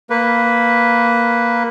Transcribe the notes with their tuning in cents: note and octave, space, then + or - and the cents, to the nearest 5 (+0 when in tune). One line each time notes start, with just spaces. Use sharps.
A#3 +0 B4 +0 F#5 +0